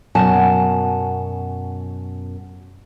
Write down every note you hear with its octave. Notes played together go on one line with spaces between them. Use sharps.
F#2 B2 F#5 G#5 A5